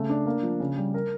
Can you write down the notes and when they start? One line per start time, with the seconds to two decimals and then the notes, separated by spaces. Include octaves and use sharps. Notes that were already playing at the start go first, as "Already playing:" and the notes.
Already playing: C#3 A3
0.09 D4
0.26 A#3
0.43 F3
0.60 C#3
0.77 G3
0.94 A#4